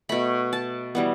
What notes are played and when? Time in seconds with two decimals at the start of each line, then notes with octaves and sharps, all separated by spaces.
0.09 B2 A3 B5
0.53 A5
0.95 E3 G3 B3